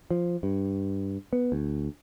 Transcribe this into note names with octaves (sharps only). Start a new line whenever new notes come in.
F3
G2
B3
D2